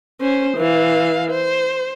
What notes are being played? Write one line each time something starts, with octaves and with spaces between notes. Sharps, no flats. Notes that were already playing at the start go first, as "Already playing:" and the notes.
C#4 C5
E3 F5
C5